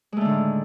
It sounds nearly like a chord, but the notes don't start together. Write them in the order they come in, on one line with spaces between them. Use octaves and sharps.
G#3 A3 D3 D#3 A2